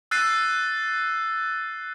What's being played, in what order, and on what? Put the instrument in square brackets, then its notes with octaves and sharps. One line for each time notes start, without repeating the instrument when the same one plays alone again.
[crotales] E6 F#6 A6 C7 D#7